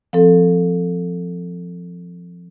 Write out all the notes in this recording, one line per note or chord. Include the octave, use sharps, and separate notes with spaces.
F3 C4 A4